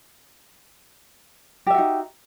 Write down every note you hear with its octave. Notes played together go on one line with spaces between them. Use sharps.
D#4 F#4 G4 E5